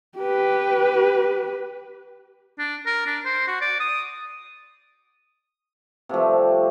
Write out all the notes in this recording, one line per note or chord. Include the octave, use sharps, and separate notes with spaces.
G4 B4
D4
A#4
D4
C5
F#4
D5
D#6
C3 F3 G3 A3